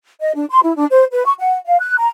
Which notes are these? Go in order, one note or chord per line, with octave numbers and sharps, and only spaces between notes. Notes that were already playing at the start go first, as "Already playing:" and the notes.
D#5
D4
C6
E4
D4
C5
B4
C#6
F#5
F5
F#6
A#5